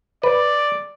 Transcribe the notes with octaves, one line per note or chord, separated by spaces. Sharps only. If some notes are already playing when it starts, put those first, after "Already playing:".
B4 D5